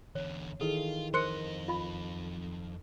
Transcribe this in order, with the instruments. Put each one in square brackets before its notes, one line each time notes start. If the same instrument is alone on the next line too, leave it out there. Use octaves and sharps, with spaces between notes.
[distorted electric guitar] E2 D3 [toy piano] C#5
[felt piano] D#3 E3 A4 [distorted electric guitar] F4 [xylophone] G#4
[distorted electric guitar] F2 D#5 [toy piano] A#4 C5 [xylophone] C6 F#6 C#7
[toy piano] F4 F5 B5